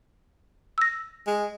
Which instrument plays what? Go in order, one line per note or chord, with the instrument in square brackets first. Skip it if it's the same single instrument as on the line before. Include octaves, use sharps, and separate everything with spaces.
[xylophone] E6 A#6
[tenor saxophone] G#3